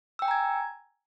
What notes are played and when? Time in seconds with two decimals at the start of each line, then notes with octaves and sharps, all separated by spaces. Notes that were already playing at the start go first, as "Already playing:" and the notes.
0.19 E6
0.22 G5
0.25 G#5
0.28 A#5
0.31 G#6